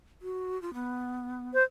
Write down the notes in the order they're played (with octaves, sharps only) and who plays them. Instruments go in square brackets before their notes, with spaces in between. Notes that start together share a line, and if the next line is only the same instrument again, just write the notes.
[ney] F#4
F4
B3
[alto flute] C5